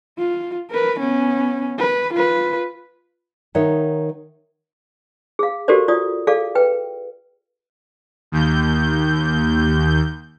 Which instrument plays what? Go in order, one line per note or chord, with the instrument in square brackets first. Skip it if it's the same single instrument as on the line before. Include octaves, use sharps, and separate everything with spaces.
[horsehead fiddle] F4
A#4 B4
B3 C#4
B4
F4 B4
[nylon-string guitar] D#3 D#4 C#5 E5 F#5
[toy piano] G#4 F5
F#4 G4 A4 A#4 C5 D5
F4 D5 D#6
G#4 A4 D5 F5
B4 G5
[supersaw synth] D#2 G6